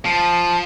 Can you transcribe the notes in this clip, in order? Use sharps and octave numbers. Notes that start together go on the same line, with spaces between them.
F3